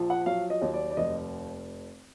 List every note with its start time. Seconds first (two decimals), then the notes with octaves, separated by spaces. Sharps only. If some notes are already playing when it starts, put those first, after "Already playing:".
Already playing: A#1 F3
0.10 F#5
0.26 F#3 F5
0.50 D#5
0.62 D#2
0.73 D5
0.91 D5
0.97 F1 D#5